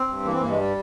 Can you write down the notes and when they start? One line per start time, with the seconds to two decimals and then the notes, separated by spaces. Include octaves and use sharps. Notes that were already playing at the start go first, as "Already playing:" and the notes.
Already playing: C4
0.08 G2
0.25 E3 A#3
0.33 C4
0.41 G2 A#3
0.49 G#3
0.57 G3